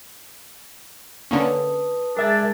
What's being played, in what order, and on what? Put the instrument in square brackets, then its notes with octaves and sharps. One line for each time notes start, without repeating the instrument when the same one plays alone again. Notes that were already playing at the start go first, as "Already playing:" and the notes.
[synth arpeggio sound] D3 A#3 C#4 [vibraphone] B4 A5 D#6
[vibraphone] G#3 G#4 [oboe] D4 [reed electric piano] A#4 E5 A6